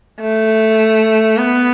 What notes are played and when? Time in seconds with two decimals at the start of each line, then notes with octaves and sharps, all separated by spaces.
0.20 A3
1.37 B3